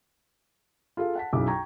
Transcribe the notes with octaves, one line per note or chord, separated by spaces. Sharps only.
F4 G#4 A4 F5
F#5 A5 B6
B1 F#2 E4 G#4 D6
G5 A#5 C#6 G#6